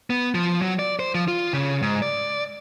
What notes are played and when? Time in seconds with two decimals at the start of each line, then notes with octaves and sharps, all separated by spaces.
0.10 B3
0.34 F3
0.62 F#3
0.79 D5
0.99 C5
1.14 F3
1.28 F4
1.53 C#3
1.82 G#2
2.02 D5